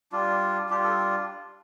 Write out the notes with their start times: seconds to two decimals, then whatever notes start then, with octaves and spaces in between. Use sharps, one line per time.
0.12 G3 D4 F4
0.69 G3 D4 F4 G4
0.84 A4